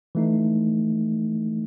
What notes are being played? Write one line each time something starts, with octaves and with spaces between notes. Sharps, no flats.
E3 A3 D#4